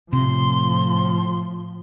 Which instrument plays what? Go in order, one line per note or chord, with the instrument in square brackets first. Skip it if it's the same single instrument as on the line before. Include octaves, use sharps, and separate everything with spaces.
[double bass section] A2 F3 [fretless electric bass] C3 [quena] C6